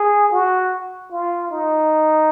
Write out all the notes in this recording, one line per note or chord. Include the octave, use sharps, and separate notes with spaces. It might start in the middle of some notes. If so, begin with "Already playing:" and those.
Already playing: G#4
F#4
F4
D#4